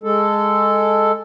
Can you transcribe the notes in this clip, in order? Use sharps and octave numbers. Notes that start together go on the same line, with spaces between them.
G#3 A4